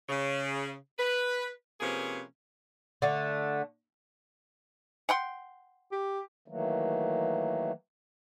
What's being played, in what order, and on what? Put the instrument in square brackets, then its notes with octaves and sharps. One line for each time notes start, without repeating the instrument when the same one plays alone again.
[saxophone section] C#3
B4
C3 F3 A#3 C#4 G#4 B4
[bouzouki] D3 A3
[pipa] F#5 G5 C6
[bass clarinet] G4
[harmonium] D#3 E3 F#3 A3 A#3